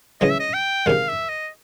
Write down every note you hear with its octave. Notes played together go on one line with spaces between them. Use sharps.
C#3 E3 G#3 D#5
E5
D#5
G5
C3 D#3 G#3 F5
E5
D#5